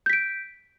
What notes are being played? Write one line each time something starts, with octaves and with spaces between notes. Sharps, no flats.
G6 B6 D7